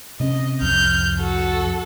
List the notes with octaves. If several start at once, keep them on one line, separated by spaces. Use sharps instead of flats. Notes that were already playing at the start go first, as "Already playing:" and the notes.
C3 C4 C#4 D#5
C2 F2 F6 G6
F#4 A4